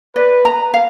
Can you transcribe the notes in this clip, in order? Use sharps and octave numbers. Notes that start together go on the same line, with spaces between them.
B4 D5
A#5
F5